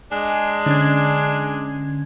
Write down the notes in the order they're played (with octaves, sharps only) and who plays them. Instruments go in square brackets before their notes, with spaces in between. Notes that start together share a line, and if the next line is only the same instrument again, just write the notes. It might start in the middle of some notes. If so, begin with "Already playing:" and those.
[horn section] G#3 D4
[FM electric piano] D3 C#4 G#6